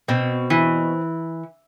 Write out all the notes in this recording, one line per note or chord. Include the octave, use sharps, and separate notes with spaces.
B2 C4
E3